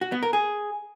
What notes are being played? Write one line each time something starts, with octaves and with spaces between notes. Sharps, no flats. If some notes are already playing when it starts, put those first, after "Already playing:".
F#4
B3
A#4
G#4